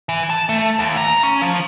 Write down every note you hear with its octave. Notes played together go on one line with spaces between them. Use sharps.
E3
A5
A3
D#2
A#5
C#4
F3